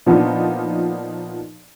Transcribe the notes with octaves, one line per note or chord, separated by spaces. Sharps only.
A#2 F3 B3 D4 D#4 F4